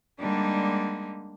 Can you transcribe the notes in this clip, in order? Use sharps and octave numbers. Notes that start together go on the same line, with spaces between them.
D3 G3 G#3 A#3 D4 D#4